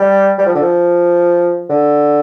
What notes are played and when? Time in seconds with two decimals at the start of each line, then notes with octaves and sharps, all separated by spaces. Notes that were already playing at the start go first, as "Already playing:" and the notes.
Already playing: G3
0.39 G3
0.46 F3
0.55 D3
0.62 F3
1.70 D3